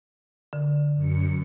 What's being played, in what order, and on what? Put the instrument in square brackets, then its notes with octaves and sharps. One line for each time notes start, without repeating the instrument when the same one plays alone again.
[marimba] D3
[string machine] F#2 C#7